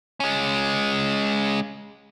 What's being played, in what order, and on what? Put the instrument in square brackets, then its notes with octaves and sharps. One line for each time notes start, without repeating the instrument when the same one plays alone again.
[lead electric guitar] G#3 C#4